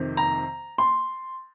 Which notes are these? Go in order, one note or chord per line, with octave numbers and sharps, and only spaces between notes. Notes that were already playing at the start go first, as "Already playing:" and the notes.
Already playing: F2 C3 D#3
A#5
C6